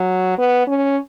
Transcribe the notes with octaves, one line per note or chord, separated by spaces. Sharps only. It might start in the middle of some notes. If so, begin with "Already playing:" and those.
Already playing: F#3
B3
C#4